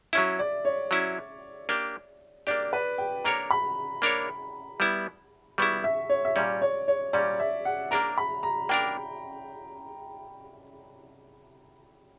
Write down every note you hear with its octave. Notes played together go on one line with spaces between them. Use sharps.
F#3 C#4 E4 E5
D5
C#5
F#3 C#4 E4
A#3 D4 G4
A#3 D4 G4 D5
B4
G5
A#3 D4 A#4 C#5 A#5
B5
A#3 D4 A#4 C#5
G3 B3 E4
G3 B3 E4 C#6
E5
C#5
E5
A#2 G3 C#4 D5
C#5
C#5
A#2 G3 C#4 D5
E5
F#5
A#3 D4 A#4 A#5
B5
A#5
A#3 D4 A#4 G5